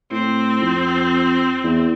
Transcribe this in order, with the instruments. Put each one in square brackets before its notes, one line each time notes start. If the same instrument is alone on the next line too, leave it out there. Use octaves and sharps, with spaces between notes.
[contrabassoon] A2 [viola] C4
[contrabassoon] F2
E2